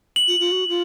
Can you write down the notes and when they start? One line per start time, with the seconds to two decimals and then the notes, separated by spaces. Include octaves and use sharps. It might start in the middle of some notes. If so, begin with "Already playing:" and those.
0.16 F#7
0.28 F4
0.40 F4
0.52 F#4
0.68 F4